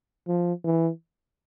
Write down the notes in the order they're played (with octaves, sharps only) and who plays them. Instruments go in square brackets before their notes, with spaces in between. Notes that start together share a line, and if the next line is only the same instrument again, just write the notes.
[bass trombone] F3
E3